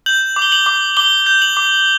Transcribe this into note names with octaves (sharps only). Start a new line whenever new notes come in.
G6 F#7
D6
G7
F#7
D6
D6 G7
G6
F#7
D6